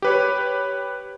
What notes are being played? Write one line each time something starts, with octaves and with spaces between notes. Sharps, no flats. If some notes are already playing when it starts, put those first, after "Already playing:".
G4 B4 C#5